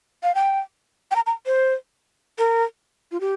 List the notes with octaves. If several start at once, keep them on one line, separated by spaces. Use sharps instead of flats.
F5
G5
G5
A#5
A#5
C5
A#4
F4
G4